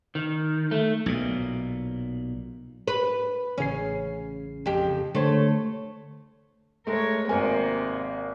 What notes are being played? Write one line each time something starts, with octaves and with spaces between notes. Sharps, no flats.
D#3
A3
B1 A#2
B4
A1 C#3 C#4 C7
F2 G4
D3 A3 C5 C#5
G#3 A3 A#4 C#5
G#1 C3 A#3 A#4 G#5